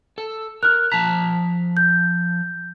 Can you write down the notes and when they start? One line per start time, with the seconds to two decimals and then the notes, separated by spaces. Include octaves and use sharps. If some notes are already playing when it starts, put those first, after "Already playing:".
0.18 A4
0.63 A#4 F6 F#6
0.92 F3 A5 A#5 B6
1.77 G6